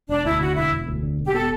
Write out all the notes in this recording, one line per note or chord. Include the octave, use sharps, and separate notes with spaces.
E1 D4
D2 E4
D3 F#4
E1 E4
E1
D2
D3
E1
G4
B3 A4